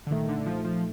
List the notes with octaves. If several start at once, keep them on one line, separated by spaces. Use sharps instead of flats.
D3
C2 A#2 D#3 A3 D#4
D3
F3
F3